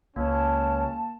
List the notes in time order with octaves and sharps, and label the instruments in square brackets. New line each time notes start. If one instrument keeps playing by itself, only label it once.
[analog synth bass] C#2 [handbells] A#3 [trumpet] C#4 [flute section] A5